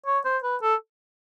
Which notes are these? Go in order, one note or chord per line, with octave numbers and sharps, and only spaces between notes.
C#5
C5
B4
A4